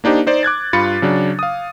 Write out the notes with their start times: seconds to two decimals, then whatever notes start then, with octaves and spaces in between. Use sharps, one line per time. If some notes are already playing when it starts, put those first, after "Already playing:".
0.04 A#3 D4 D#4 G4 C5
0.27 D#4 C5 D5
0.43 D6 F#6 G#6 A6
0.73 G2 F4 B5 A6 C#7
1.02 C#3 F#3 D4
1.39 F5 D#6